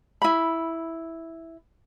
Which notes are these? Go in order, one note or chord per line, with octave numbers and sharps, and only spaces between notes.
E4 B5